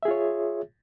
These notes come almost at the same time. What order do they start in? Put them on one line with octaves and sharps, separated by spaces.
E5 G#4 F4 C#5